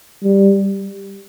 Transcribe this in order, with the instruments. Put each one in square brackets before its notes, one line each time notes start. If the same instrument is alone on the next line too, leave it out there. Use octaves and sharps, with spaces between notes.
[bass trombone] G3